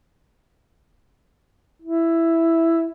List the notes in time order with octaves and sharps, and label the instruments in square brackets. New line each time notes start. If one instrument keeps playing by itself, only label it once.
[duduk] E4